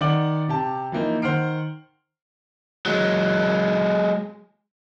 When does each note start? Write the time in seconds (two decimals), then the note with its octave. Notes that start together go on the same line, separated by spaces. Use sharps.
0.01 D#3 D5 F#5 D6 F#7
0.48 C3 G4 A5
0.92 E3 F3 A#3 D#4
1.22 D#3 C5 F#5 F6 C7 D7
2.86 F#3 G#3